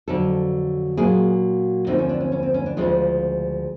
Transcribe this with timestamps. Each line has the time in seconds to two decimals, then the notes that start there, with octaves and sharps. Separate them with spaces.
0.08 F2 D3 F#3 A4
0.97 A#2 F#3 A#3 G#4
1.87 D#2 D3 F3 A3 C4 D#4
1.98 C#4
2.09 D4
2.21 C#4
2.32 C#4
2.43 C4
2.54 C#4
2.66 D4
2.77 D2 C#3 F3 G#3 C#4